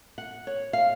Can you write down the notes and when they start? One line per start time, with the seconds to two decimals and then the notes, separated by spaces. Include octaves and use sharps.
0.18 F#5
0.47 C#5
0.73 F5